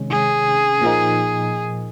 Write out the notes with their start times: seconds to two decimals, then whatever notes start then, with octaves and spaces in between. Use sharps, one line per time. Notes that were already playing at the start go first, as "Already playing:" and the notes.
Already playing: C3 D#3 G#3 C#4
0.10 G#4
0.82 A#2 F3 A#3 D#4